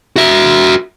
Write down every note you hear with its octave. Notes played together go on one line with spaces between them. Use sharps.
F#4 E5